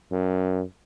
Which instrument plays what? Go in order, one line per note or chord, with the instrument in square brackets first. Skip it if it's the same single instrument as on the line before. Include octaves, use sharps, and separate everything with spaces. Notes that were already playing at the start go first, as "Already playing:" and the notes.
[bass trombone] F#2